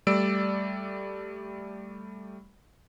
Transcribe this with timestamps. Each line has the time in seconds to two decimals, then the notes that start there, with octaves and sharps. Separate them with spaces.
0.07 G3 A3 D5 E6 D7